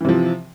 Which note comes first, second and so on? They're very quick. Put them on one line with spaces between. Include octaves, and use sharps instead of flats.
E3 C3 F3